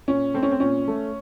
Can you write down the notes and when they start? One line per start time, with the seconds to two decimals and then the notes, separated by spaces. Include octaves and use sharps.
0.08 A#2 C#4
0.34 A3 C4
0.43 C#4
0.51 C4
0.60 A#2 C#4
0.88 A3